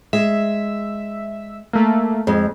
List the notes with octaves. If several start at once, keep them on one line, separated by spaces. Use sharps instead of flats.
G#3 E5
A3 A#3
F2 G#3